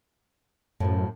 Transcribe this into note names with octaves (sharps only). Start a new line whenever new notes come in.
F#2 A2 F3 A3